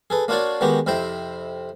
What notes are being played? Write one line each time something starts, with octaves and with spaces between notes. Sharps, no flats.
G#4 A4 B4
A#3 D4 F4 F#4 C#5 D5
D#3 G#3 B3 F#4 G4
F2 C3 E4 C5 G5